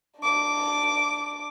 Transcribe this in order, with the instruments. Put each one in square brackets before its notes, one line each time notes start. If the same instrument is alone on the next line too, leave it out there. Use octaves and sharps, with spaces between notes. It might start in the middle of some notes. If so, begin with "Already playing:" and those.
[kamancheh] D4 D6